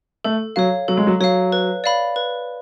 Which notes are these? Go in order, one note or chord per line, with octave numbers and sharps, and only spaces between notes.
A3 A4
F#3 C#5 F5
F#3 A4
G#3
F#3
F#3 C#5 F5
B4
D5 F5 B5
B4